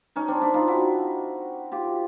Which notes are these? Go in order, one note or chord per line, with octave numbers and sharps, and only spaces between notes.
C#4 D#4
C4 D4
D4 E4
D#4 F4
E4 F#4
F4 G4